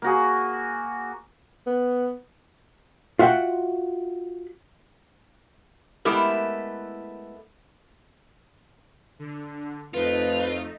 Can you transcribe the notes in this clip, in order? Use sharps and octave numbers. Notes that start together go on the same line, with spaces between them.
A#3 F#4 G#4
B3
F4 F#4 E5 F#5 G5
G#3 A3 B3 E4 G4 A#4
D3
F2 A3 D#4 F4 B4